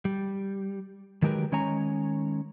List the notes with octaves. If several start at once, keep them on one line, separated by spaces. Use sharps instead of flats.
G3
D#3 F#3 G#3 G4 A#4 B4
D#3 G#3 C#4 C#5 G#5 A#5